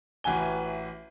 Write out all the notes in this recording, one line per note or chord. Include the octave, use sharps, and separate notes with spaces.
A1 E3 F#4 G#5 G7